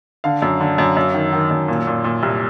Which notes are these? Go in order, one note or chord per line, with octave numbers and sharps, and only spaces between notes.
D3 F5
F#2
D3
F#2
F#2
D#3
D#3
F#2
A#2
A#2
A#2
C2